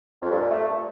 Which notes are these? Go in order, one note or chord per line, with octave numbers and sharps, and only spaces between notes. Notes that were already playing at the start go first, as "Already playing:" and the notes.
F2
G2
A#2
A3